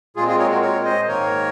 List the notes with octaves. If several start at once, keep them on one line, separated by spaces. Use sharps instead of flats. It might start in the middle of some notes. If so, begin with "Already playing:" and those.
A#2 G#3 C4 F4 G#4
F4 G#4
A#4 C#5
F#4 A#4
A#4 C#5
C5 D#5
G#2 D#3 A#3 A#4 C#5